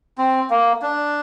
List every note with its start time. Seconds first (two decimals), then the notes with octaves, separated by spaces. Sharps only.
0.18 C4
0.50 A#3
0.82 D4